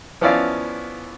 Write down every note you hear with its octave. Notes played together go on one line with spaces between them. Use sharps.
F3 B3 C#4 E4 D5 F5